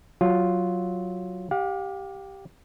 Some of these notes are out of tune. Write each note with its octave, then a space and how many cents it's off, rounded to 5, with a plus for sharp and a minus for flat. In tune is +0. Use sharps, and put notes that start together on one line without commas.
F#3 +0 F4 +0
G4 +0 F5 +40